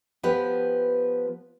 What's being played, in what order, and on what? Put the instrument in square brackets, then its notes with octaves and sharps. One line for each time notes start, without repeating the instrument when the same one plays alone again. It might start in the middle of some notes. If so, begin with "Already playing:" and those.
[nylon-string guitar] F3 B3 G4 B4